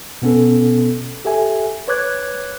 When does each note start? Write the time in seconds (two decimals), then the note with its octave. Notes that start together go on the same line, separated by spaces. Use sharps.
0.22 B2 B3 C#4 A4
1.25 G4 A4 E5 G#5
1.88 B4 C#5 D6 F#6 G#6